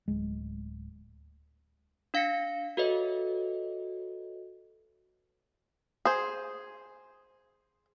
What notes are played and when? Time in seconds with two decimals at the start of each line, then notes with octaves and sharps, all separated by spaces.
0.08 D1 G#3
2.14 D4 F5 A#6 B6 C#7
2.77 F#4 A4 B4 C#5 D#5 E5
6.05 G#4 C5